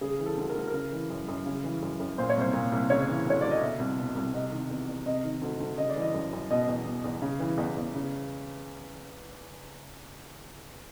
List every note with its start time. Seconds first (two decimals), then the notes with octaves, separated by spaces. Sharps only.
0.01 C#3 G#4
0.19 E3
0.26 A4
0.37 D2
0.50 A#4
0.55 D2 A4
0.67 A#4
0.74 C#3
0.92 E3
1.10 F#2
1.28 F#2
1.46 C#3
1.64 E3
1.82 F#2
2.00 F#2
2.18 A#2 C5
2.30 C#5
2.36 C2 C5
2.53 A#2
2.72 C2
2.90 C#3 C#5
3.08 E3
3.26 D2 C#5
3.41 D2 D5
3.51 D#5
3.61 B2 E5
3.79 C2
3.97 B2
4.15 C2
4.33 C3 D#5
4.52 D#3
4.69 E2
4.88 E2
5.06 C3 D#5
5.24 D#3
5.41 D2
5.60 D2
5.78 C#3 D#5
5.90 D5
5.96 E3
6.02 D#5
6.14 F#2
6.33 F#2
6.50 B2 D#5
6.68 E2
6.85 B2
7.04 E2
7.22 C#3
7.40 E3
7.58 E2
7.76 E2
7.95 C#3